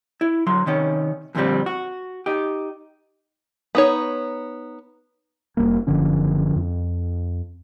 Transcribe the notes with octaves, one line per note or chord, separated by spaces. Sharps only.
E4
D3 F#3 C6
C3 D#3 C#4
F2 A#2 D3 F3 G3 C4
F#4
D#4 G4
B3 D#4 C#5
F1 D#2 G3 A#3
F#1 D3 F3 C#4
F2